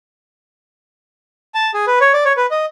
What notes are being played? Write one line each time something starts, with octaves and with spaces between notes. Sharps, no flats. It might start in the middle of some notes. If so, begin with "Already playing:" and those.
A5
G#4
B4
C#5
D5
C#5
B4
D#5